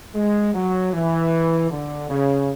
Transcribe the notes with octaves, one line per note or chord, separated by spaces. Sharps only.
G#3
F#3
E3
D3
C#3